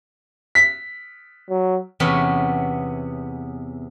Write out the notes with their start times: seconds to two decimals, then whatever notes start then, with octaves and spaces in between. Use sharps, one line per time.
0.55 B6
1.50 F#3
2.00 E2 C3 B3 C#4